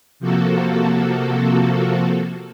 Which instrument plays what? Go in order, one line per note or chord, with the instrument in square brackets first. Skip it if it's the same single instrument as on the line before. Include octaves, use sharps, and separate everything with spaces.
[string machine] C3 F3 A#3 F#4 A4